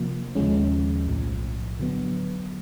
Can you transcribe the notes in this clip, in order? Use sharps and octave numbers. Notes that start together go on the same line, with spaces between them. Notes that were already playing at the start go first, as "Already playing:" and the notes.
Already playing: C3 F3 A#3
D#2 C#3 F3 G#3 C#4
B1 A2 F3
D3 F#3 B3